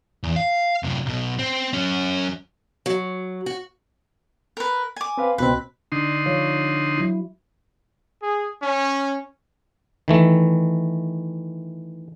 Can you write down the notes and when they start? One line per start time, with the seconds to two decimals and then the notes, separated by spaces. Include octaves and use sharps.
0.24 E2
0.36 F5
0.83 F#2 C3
1.06 B1 B2
1.39 C4
1.73 F#3 C#4
2.86 F#3
3.46 F#4
4.57 A#4 B4
4.96 G#5 D6
5.18 C4 B4 F5
5.38 C#2 B2 C4 B4
5.92 D3 D4 D#4 C6
6.25 F3 C#5 F5
6.98 F#3 E4
8.22 G#4
8.63 C#4
10.08 D#3 E3 A3